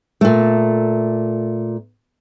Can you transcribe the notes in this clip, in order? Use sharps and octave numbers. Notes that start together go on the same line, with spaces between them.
A#2 A3